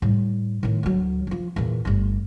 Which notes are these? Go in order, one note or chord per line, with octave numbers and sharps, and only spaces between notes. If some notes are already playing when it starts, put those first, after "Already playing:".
A2 G3
A2 D#3
D2 F#3
F3 F#3
E2 A#2
G1 A3